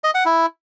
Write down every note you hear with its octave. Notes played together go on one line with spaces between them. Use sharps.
D#5
F#5
E4